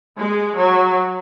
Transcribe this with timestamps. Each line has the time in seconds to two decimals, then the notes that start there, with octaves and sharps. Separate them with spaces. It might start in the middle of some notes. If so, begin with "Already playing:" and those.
0.17 G#3
0.57 F#3